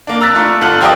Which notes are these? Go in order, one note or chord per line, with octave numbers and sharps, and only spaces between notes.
A#3 D4
A#5 E6 F#6 A6 B6
A3 D4 F4
G1 F4 A4 F6 F#6 F#7
F3 F4 G4 A#4 D5 D#5